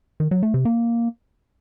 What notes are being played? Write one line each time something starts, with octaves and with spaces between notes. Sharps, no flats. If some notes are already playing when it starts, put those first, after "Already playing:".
D#3
F#3
A3
C3
A#3